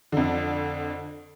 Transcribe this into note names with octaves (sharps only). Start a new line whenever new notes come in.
F2 D3